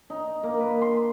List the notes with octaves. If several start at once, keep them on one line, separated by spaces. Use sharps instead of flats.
D#4
A#3
B4
C6